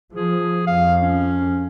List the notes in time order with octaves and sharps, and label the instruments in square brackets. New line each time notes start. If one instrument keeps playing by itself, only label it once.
[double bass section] F3 [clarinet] G#4
[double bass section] F2 [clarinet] F5
[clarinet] C#4